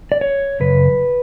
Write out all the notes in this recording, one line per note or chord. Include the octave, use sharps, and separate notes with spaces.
D5
C#5
F#2 C#3 B4